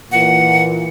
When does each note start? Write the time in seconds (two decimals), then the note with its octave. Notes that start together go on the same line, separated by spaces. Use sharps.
0.12 A#2 E3 F#5